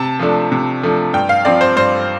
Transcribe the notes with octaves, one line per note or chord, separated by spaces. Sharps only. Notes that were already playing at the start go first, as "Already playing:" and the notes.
Already playing: C3 A5
F3 A3 D4
C3
F3 A3 D4
G2 G5
F5
F3 C4 D5
C5
G2 C5